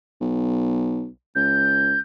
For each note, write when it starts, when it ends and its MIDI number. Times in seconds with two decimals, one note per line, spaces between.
0.20 1.07 35
1.35 1.97 37
1.35 1.99 91